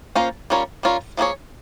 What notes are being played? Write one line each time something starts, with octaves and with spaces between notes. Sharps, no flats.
A#3 C#4 F4 C5
G3 C#4 F4 A#4 C#5
G3 C#4 F4 A#4 C#5
F3 A#3 E4 G#4 C#5